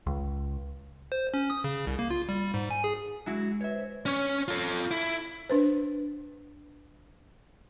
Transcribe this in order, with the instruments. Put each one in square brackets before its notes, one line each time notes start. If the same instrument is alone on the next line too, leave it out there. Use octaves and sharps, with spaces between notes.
[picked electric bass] C#2
[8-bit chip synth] C5
C#4
D#6
C#3
C2
A#3
F4
G3
G#2
G#5
G#4
[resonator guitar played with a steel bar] F#3 E4 F#4 [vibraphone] G#3
[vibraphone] B4 [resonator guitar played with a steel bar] C#5 E5
[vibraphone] C5
[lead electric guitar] C#4 C#5
F4 A4
E4
[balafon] D4 B4 C5